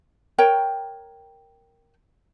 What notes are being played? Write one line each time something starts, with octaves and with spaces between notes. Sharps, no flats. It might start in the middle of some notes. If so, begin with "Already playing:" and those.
A#4 C#5 G5